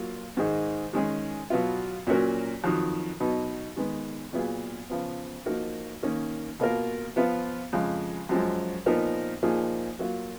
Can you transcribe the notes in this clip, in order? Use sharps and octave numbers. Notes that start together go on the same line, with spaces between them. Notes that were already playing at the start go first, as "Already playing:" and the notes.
Already playing: F#3 A#3 F4
G#2 D#3 G#3 D#4 G#4
D#3 G#3 C#4 G#4
B2 F#3 B3 F4
A#2 F#3 C#4 F#4 A#4
F2 D#3 F#3
B2 F#3 B3 D#4
D#3 G#3 B3
A#2 F#3 B3 F4 G#4
C#3 F3 B3
F3 A#3 D#4 F#4 A#4
D#3 A#3 C#4
B2 A#3 F4 A#4
F3 B3 F4
F2 C#3 G#3
F#2 F3 G#3
A#2 F3 B3 D#4 A#4
A#2 F3 A#3 D#4 G#4
F#3 A#3 F4